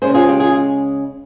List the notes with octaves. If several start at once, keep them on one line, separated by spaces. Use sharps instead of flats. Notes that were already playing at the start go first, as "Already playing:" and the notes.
C#3 G#3 C#4 G#4 C5
F4 G#4
G4
F4 G#4